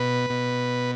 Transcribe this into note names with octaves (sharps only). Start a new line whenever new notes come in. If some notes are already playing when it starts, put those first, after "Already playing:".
Already playing: B2 B4
B2